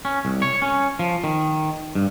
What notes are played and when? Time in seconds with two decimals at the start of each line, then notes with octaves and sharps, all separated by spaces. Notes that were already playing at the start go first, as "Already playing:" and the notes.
0.05 C#4
0.25 C2
0.42 C#5
0.62 C#4
0.99 F3
1.24 D#3
1.95 G2